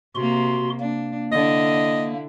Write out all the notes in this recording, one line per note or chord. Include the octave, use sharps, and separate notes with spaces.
C3 A#3 F#4 C6
A#3 D4
D3 E4 D#5